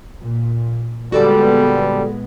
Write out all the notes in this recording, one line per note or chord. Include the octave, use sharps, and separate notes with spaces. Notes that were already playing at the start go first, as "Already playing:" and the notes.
A#2
A#2 D3 G3 G#3 B3 F#4 A4 D5